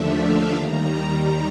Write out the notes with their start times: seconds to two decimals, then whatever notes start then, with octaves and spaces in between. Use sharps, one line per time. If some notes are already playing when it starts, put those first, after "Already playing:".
Already playing: D#2 D3 F3 A3 D4 E5
0.14 F5
0.54 D#2 D#3 G3 A#5